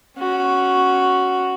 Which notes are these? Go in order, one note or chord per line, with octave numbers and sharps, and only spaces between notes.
C#4 F#4